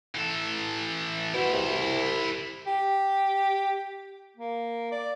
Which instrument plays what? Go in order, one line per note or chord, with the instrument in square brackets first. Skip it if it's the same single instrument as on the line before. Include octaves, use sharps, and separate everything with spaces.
[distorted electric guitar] E3 A4
[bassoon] B2 [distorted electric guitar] E4 C5
[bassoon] C2
[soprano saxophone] G4
A#3
D5